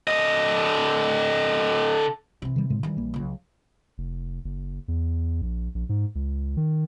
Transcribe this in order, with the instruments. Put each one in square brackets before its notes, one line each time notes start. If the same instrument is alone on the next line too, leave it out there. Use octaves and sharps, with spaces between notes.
[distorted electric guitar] D3 D#5
[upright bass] C3 E3
[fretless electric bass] D#3 G3
A2 C#3 G#3
[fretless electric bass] D#3 [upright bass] E3 G3
[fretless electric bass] A#1 A#3
[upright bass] C#2 F#3
[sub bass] F1
F#1
E2
A#1
A#1
G#2
C#2
D#3